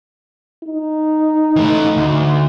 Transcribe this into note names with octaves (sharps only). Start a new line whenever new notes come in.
D#4
E3 A3
D2